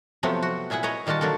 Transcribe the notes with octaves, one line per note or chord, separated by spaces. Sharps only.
C3 F3 F#3 A3 B3 C4
F#4
A#2 E4 G#4 E5 F#5
B4 C#5 D#5 A#5
A#2 D#3 G3 F4 F#4 A5
D3 F#3 A#3 F#4 A4